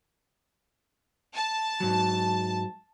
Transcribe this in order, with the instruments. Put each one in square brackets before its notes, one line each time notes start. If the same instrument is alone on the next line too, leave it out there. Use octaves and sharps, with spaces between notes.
[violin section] A5
[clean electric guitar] G#2 F#3